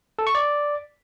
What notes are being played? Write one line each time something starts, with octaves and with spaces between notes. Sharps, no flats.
A4
C#6
D5